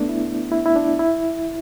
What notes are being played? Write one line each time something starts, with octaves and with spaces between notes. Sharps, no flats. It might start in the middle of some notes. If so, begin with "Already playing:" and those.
Already playing: A3 B3 D4
E4
E4
E4
D4
E4